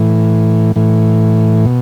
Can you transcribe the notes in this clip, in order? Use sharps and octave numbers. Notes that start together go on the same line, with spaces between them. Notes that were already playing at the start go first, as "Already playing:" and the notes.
Already playing: A2 E3
A2 E3
B2